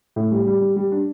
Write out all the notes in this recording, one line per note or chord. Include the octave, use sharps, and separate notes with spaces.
A2
G3
G3
G3
G3
D4